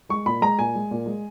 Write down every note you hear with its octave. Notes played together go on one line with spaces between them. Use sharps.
G#3 C#6
A#2 B5
G#3 A#5
A#2 G#5
G#3
A#2
G#3